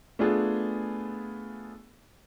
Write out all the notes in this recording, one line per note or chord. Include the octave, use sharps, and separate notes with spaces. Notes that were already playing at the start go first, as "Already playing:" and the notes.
A3 B3 D4 F4 G#4